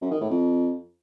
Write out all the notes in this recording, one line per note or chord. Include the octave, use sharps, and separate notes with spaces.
F#2
D#3
A2
F2